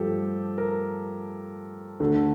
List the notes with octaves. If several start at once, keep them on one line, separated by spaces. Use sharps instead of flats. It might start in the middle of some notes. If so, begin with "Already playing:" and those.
Already playing: G2 F3 A3 G4 A4
A#4
D2 D3 A3